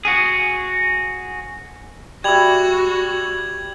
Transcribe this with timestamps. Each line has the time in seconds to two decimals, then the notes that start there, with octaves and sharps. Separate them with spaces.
0.05 F#4 G#4
2.24 G3 F#4 E5 G#6 F7 F#7